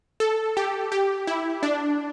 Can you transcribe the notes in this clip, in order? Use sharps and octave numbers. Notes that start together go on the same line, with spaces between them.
A4
G4
G4
E4
D4